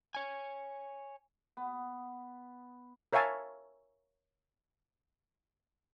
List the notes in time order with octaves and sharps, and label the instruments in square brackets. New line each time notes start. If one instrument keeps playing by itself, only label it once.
[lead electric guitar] C#5 G#5
[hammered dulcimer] B3
[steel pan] A#4 C#5 E5 F5 G#5 A5